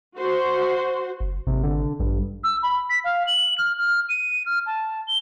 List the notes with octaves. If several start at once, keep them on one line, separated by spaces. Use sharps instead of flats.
F#4 C5
F#1
G#1 C3
D3
A1 G2
E6
B5
B6
F5
F#7
F6
F6
D#7
F6
A5
G7